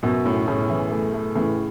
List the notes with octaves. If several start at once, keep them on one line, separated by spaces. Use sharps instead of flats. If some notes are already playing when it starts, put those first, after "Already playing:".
F#2 B2 F#4
A2 C#4
A2 C#3 C#4
E3
A3
A3
A2 C#3 E3